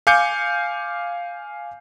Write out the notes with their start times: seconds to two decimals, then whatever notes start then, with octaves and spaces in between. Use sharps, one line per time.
0.07 F5 G#5 D6 G6 C#7